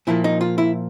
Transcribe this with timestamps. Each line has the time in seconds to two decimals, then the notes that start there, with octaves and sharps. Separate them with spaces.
0.07 A#2 F3 A#3 E4
0.24 D#4
0.41 F4
0.58 E4